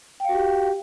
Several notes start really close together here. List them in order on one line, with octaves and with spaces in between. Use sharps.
G5 F5 F#4 G4